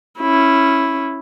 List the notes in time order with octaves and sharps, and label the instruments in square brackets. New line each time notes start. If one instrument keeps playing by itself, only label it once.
[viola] C#4 E4